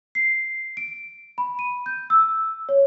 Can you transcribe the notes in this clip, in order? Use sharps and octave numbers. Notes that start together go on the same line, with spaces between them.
C7
D7
B5
D#7
G6
E6
C#5